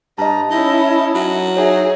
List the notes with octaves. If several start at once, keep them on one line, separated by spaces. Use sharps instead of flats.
G2 D#5 A5 A#5
C#4 D#4 E4
F#3
D#4 G#4 C#5 E5